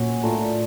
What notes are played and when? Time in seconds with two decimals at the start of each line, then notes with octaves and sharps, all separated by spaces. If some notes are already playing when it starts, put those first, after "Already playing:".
Already playing: A#2 F#3 C#4
0.23 A2 A3 D4 F4 A#4